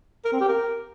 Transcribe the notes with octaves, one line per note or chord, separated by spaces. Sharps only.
A#4
C4
G4
A#4